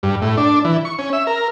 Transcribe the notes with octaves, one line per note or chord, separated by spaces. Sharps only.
G2
A2
D4
E3
C#6
C#4
E5
A#4